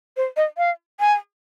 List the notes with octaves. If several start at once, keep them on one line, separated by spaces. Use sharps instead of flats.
C5
D#5
F5
G#5